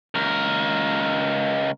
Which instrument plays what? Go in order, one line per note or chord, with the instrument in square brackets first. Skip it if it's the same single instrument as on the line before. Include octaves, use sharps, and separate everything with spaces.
[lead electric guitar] C#2 A#4